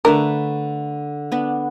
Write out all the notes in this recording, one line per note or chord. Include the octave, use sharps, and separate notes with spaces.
D3 A3 D4 A#4 B4
B3 D4